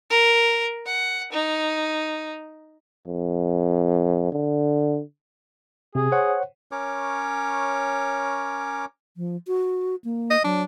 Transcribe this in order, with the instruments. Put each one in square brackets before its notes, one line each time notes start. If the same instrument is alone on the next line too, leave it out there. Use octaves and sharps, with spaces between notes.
[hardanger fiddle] A#4
F#5
D#4
[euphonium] F2
D3
[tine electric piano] C3 [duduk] G#4
[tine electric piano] C5 C#5 F#5
[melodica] C#4 A#4 C#5 D6
[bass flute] F3
F#4
A#3
[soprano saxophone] D#5
[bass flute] F#3 [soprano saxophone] D4